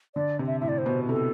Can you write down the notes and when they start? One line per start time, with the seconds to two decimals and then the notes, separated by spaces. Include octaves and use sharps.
0.15 D3 D5
0.39 C3
0.47 E5
0.60 A2 E5
0.68 D5
0.78 C5
0.86 B2
1.09 C3 A4